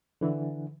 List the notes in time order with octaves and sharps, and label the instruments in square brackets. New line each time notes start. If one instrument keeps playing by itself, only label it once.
[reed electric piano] D3 E3